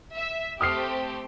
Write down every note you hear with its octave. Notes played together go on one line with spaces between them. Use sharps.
E5
A3 C4 G4 D#6 F6 C7